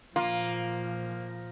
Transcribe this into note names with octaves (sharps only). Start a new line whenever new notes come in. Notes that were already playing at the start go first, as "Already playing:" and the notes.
A#2 F3 A#3 F4